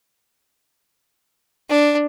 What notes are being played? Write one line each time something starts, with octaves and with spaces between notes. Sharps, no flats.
D4